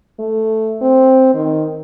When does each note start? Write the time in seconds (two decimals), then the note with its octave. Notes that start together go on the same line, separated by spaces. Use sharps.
0.19 A3
0.81 C4
1.35 D#3